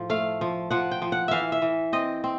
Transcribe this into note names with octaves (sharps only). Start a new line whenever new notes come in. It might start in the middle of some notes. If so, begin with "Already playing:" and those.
Already playing: A2 F3
A3 F5
F3
F3 F#5
G5
F3
F#5
E3 E5 F5
E5
E3
C4 D#5
C4